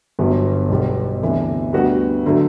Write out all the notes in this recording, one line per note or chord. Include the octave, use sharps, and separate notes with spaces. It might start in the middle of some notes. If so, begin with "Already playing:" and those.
G1 G2 F#3 B3
B1 B2 G3 B3
D2 C3 E3 B3 D4
D2 D3 G3 B3 F#4
D3 F#3 A3